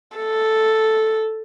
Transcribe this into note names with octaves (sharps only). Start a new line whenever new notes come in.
A4